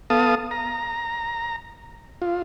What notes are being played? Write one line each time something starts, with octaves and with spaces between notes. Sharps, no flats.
B3 A4 F5 A5 D#6
A#5
F4